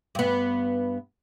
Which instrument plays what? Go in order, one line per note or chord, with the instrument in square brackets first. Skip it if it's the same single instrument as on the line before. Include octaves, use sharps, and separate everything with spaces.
[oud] G2 B3